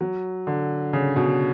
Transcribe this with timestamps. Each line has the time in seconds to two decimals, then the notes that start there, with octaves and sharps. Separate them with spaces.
0.01 F#3
0.47 D3
0.93 C#3
1.16 B2